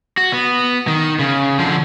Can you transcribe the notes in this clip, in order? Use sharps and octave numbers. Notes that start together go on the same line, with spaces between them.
F#4
B3
D#3
C#3
D3 F3